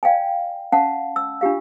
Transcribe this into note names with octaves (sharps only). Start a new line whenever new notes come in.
D5 F5 G5 G#5
C#4 F5 F#5 A5
E6
D4 F4 G4 F5